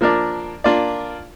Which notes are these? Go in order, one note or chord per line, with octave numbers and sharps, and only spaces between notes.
F3 A#3 D4 A#4 D5
A#3 D4 F4 D5